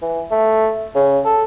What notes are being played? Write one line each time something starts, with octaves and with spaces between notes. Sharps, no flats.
E3
A3
C#3
A4